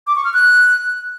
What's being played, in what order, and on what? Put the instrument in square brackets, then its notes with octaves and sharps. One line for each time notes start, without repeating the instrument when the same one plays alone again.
[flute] D6
C#6
F6
F#6